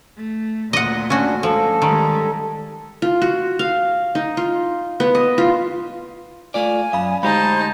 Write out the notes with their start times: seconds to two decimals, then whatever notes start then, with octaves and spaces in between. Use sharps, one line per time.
0.17 A3
0.73 D2 A#2 D#5 F#5
1.10 C#4 D4 F#4
1.43 D2 F3 G#3 A4
1.82 D#3 G3 G#3
3.02 F4
3.22 F#4
3.59 F5
4.15 D#4
4.37 F4
5.00 B3
5.15 D#5
5.38 F4
6.54 A3 F4 D5 G#5
6.93 F#2 F5 B5
7.23 D2 G#3 D#4 G4 C5 A5 B5